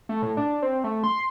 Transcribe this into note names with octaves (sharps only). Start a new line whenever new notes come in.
A3
A2
D4
C4
A3
C6